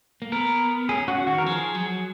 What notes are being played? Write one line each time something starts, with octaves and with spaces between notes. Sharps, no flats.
A#3
B3 A#4
C#4 G#4
C#4 F#4
D#3 F#4
A#4
F3 G#4
F#3